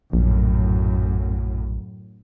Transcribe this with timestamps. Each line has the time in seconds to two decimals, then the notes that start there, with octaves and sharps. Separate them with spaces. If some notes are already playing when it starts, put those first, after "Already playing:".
0.13 A#1 F#2 A2